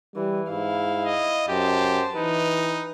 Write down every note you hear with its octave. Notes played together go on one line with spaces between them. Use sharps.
E3 G3
G#2 E4 F5
D#5
F#2 G4 C5 A5
E3 D#4 B4